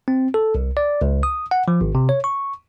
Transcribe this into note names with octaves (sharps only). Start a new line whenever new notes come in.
C4
A4
C2
D5
C#2
D#6
F#5
F3
G#1
C3
C#5
C#6